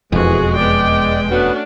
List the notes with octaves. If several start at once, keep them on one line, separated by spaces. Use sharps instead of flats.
E1 F2 E3 G#3 F#4 G#4
B3 D5 G5
A3 B3 C#4 D4 F#4 B4